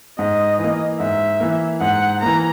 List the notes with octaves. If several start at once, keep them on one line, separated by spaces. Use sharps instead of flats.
G#2 D#5
E3
A#3
G#2 E5
E3 A#3
G#2 F#5
E3 A#3 A#5